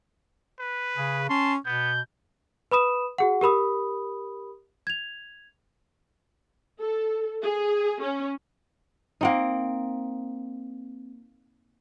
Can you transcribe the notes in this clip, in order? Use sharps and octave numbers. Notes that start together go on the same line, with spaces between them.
B4
C#3 G#4
C#4 A5 C6
B2 B3 G6
B4 B5 D#6 E7
F#4 G#4 F#5
G4 A#4 B5 D#6
G#6 F7
A4
G#4
C#4
A#3 C4 D#4